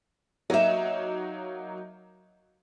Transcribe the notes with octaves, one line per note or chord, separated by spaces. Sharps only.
F#3 A#3 D#4 D#5 E5